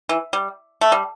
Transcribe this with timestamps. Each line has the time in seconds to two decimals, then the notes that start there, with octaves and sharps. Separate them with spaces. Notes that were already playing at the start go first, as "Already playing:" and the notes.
0.09 E3
0.33 G3
0.81 A3
0.92 G3